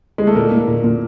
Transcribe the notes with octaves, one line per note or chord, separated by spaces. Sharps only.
G#3
A3
A#2 A#3
A#2
A#2
A#2